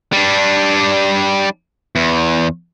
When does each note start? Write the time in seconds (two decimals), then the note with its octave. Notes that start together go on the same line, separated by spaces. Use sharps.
0.13 G3 D4
1.96 E2